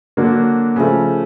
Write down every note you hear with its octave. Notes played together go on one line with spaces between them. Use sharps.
D3 F#3 A#3 D4 F#4
C#3 F3 A3